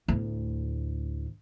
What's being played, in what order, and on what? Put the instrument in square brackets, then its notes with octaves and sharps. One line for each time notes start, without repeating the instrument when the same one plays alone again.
[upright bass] D2 A2